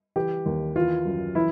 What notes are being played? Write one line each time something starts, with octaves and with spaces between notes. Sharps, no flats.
E3 G4
D#2
E3 F4
F#2
E3 E4